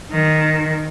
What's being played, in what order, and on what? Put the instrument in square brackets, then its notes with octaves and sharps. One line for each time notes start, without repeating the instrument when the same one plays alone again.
[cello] D#3